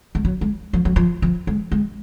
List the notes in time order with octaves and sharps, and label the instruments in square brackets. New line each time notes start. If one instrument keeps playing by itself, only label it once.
[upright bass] G#3
F#3
G#3
F3
F#3
F3
F3
G#3
G#3